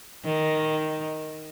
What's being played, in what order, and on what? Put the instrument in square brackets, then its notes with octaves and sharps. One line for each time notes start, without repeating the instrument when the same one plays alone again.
[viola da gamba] D#3